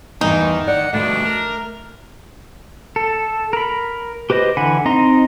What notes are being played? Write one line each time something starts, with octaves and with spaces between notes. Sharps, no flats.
E2 G2 D#3 E3 D#4
D5 F#5
G2 B2 A3 D4
A#4
A4
A#4 B5
G4 B4 C5 D#5
D3 E3 F#5 G#5 B5
C4 D#4 D#5 A#5 C6